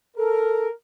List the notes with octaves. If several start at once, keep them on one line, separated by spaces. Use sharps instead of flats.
A4 A#4